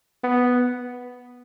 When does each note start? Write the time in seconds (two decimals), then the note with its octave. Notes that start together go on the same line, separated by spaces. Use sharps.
0.24 B3